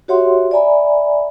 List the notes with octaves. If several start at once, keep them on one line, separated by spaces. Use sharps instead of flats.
F#4 G4 C#5 E5 F#5 C6
D5 E5 G#5 A#5 B5